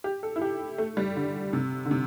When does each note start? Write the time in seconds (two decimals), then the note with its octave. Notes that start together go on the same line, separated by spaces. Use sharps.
0.04 G4
0.23 A4
0.36 E4
0.42 G4
0.78 A3
0.97 G3
1.16 D3
1.53 C3
1.85 D3
1.91 C3